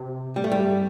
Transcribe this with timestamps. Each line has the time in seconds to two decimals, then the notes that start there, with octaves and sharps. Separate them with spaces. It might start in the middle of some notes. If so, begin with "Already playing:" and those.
Already playing: C3
0.36 A2 G3
0.44 A3
0.52 G3
0.59 G2